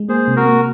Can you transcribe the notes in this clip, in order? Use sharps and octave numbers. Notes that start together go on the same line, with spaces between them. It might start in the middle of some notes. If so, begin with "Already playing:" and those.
Already playing: G#3
A#3 G#4 C5
C3
F#4 A#4
A#3